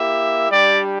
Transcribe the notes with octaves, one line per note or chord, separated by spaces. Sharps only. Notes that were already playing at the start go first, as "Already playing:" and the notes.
Already playing: A#3 E4 G4 E5
G3 D4 G4 D5